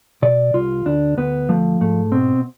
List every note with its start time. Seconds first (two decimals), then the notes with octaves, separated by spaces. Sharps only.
0.22 B2 D5
0.54 C2 F4
0.86 D2 D4
1.17 D2 B3
1.49 F3 A3
1.81 G#2 A3
2.12 B2 C4